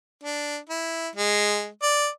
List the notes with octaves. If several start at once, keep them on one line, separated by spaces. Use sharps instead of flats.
D4
E4
G#3
D5